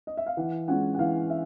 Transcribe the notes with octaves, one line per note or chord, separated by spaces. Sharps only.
D#5
E5
F5
E3 F#5
G#3 C#4 F4 F#5
F#5
E3 F5
E5